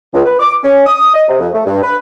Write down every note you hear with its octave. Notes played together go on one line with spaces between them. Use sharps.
C#2
B4
D6
C#4
D#6
D#5
C3
F2
A3
G2
B4